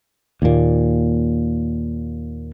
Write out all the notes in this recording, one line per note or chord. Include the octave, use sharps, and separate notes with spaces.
D#2 A#2